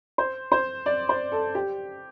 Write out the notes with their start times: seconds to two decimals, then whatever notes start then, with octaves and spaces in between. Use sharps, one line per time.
0.18 C5
0.52 C5
0.86 D5
1.09 C5
1.32 A4
1.55 G4